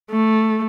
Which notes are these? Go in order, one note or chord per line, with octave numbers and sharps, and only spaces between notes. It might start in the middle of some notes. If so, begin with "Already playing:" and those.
A3